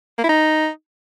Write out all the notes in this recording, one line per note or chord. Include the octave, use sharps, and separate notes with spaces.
A#3
E4
D#4